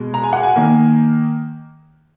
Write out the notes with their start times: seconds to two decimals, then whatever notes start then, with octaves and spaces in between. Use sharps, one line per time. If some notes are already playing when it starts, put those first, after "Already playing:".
Already playing: B2 G#3
0.14 A#5
0.24 G#5
0.33 F#5
0.43 G#5
0.56 D#3 A#3